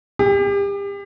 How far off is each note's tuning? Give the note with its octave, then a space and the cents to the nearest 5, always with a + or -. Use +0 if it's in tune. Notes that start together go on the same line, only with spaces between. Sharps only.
G4 +35